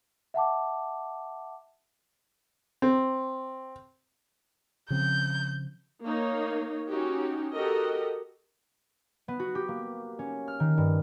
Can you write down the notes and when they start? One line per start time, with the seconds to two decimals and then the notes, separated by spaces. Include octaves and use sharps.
0.34 E5 F#5 A5 D6
2.82 C4
4.90 C#3 F3 C4 G6
6.03 A#3 D#4 C#5
6.88 C#4 D#4 F#4 G4
7.54 F#4 G4 A4 A#4 D#5
9.28 B3
9.39 F#4
9.55 G4
9.68 A#3
10.19 C#4
10.48 F6
10.60 D#3
10.78 G2